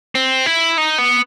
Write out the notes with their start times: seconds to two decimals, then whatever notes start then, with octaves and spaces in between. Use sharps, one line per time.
0.15 C4
0.46 E4
0.78 D#4
0.98 B3